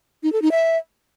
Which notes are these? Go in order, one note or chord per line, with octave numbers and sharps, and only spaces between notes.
D#4
A4
D#4
E5